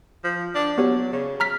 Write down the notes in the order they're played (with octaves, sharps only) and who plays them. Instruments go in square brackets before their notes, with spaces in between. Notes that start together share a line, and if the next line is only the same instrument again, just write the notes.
[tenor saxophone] F3
D4
[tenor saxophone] F#3 [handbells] B3 G4 C#5
[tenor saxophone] C#3
[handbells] A#5 F6 B6